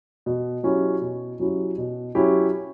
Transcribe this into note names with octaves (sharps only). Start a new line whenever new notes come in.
B2
F#3 C#4 E4 G4
B2
F#3 C#4 E4 G4
B2
F#3 C#4 E4 G4